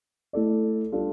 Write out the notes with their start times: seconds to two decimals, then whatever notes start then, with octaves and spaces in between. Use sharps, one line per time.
0.33 A3 E4 A4 D5
0.92 G3 D4 F4 A4